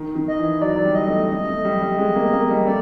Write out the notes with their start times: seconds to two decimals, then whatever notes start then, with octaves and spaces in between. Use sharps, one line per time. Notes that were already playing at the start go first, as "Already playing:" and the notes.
Already playing: D#3
0.15 D#3
0.28 D#5
0.39 E3
0.61 F#3 D5
0.76 F#3
0.85 G3
0.95 D#5
1.07 A3
1.30 A3
1.47 A3
1.65 G3
1.81 G3
1.98 G#3
2.15 A#3
2.33 A#3
2.50 G3
2.66 A3 D5